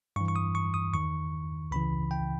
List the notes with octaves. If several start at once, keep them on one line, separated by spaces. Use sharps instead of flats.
G2 E3 C#6
C#6
D#6
C#6
D#6
E2 D#3 C#6
C#2 C#3 E3 B5
G5